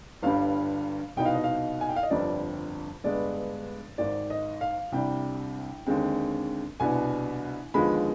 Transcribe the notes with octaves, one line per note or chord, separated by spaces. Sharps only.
G1 G2 D3 G3 F5
C2 B2 B3 D#4 G5
F5
D#5
F5
G#5
G5
F5
D#5
G1 F2 D3 G3 D5
G2 D3 G#3 B3 D5
G#1 G#2 D#3 D5
D#5
F5
C2 C3 G3 D4 G5
D#2 D3 G#3 C4
C2 B2 B3 D4 G#5
D#2 D3 F3 G#3 B3 B5